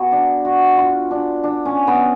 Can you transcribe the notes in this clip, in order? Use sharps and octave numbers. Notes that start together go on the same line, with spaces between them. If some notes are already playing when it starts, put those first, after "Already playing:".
Already playing: B3 F#4 G#4
D4
F#4
F4
D4
D4
C#4
B3